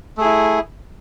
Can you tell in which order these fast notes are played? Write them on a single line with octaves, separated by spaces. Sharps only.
A3 G#4 E4